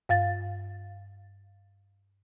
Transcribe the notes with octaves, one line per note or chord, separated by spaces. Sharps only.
G2 F5 A6